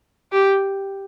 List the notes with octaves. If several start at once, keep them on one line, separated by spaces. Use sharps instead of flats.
G4